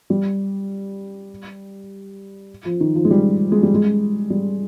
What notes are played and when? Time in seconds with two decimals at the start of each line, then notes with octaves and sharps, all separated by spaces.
0.10 G3
2.65 F3
2.80 D#3
2.95 F3
3.05 G#3
3.11 G3
3.52 G#3
3.63 G3
3.74 G#3
4.30 G3